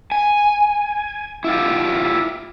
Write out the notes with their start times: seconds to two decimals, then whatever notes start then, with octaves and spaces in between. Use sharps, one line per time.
0.12 G#5
1.44 E4 F4 G4